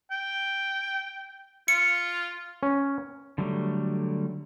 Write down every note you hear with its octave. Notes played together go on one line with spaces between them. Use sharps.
G5
F4 C#7
C#4
D3 F#3 G3 A3